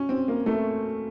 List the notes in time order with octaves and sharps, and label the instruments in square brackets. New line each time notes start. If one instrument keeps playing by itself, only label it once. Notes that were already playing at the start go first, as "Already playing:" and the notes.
Already playing: [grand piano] C#4
C4
A#3
A3